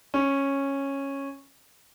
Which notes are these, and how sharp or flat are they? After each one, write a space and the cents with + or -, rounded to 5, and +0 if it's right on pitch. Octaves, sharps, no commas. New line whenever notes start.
C#4 -10